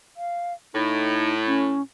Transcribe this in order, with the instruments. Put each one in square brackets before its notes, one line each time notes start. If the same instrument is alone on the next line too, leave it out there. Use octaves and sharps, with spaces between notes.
[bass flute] F5
[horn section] A2 [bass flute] D#4
[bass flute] C#4